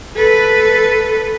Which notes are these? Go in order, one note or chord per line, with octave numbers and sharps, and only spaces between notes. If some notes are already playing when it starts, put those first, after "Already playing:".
A4 B4